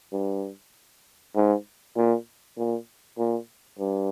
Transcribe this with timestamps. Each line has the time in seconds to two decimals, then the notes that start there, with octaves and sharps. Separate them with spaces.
0.13 G2
1.35 G#2
1.96 A#2
2.58 A#2
3.18 A#2
3.79 G2